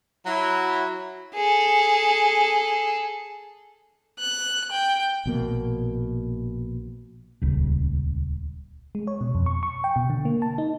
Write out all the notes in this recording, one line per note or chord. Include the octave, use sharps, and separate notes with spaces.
F#3 E4
G#4 A4
F#6
G5
A#1 B2 A#3
D#1 C#2
G#3
C#5
B2
F2
C#6
C#6
G5
B2
D3
A#3
A5
D#4